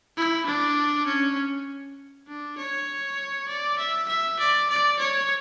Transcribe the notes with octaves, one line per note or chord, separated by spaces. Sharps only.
E4
D4
C#4
D4
C#5
D5
E5
E5
D5
D5
C#5